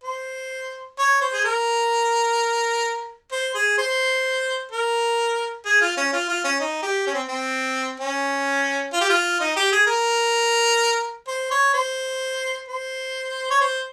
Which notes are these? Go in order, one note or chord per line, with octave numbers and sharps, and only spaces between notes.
C5
C#5
C5
G#4
A#4
C5
G#4
C5
A#4
G#4
F4
C#4
F4
F4
C#4
D#4
G4
C#4
C4
C4
C#4
F4
G4
F4
D#4
G4
G#4
A#4
C5
C#5
C5
C5
C#5
C5